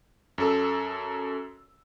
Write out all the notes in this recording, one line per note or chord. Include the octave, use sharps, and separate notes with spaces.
F#2 A4 E6